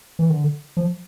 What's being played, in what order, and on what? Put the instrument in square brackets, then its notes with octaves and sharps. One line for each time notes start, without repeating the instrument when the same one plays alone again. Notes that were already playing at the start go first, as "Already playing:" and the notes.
[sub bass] E3
D3
F3